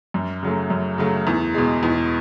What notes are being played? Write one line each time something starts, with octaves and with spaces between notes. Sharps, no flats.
F#2
C#3 F#3 A3
F#2
C#3 F#3 A3
E2
B2 G#3
E2